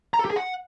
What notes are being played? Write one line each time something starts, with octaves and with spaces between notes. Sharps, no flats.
A#5
A4
G4
G#4
F#5